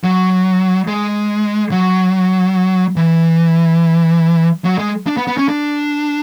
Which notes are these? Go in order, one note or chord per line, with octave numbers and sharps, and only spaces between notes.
F#3
G#3
F#3
E3
F#3
G#3
D4
B3
B3
C#4
D4